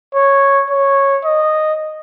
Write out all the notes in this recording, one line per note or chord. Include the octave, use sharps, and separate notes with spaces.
C#5
C#5
D#5